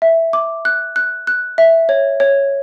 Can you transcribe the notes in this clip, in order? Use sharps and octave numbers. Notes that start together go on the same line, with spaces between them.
E5
D6
F#6
F#6
F#6
E5
C#5
C#5